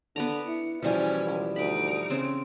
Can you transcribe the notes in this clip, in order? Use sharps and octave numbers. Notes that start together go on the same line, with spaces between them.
D3 B3 D5 A#5
E4 C#7
E2 B2 E3 F3 G3 C#4 E4 G#5
C#2
D2 D#4 B5 D7
C#3 C4 C#4